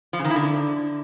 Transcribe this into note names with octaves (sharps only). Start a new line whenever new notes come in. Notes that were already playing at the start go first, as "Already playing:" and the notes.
F3
C#3
D#3
E4
D3